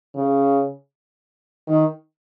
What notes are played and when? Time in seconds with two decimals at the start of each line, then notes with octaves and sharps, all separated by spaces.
0.16 C#3
1.68 D#3